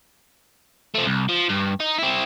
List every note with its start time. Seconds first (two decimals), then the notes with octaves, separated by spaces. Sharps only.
0.95 F3 A3
1.06 C2
1.29 F3
1.49 G2
1.80 D#4
1.98 C4 E4